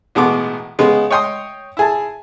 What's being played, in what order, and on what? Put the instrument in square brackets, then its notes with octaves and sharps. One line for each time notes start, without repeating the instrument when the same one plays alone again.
[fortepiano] A1 B2 G#3 B3 D6
C#3 G#3 B3
C#5 D#5 G5 C6 D#6
E4 G#4 A5